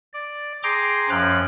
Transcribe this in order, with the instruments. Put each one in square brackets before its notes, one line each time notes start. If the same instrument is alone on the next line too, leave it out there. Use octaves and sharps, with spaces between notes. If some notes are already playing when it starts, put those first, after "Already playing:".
[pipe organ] D5
G#4 G5 A#5 C6 D6
F#2 F3 C#4 G5 F#6